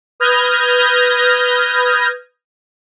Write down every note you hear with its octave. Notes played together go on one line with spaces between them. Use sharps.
B4 D#6 F6 G6 G#6 A#6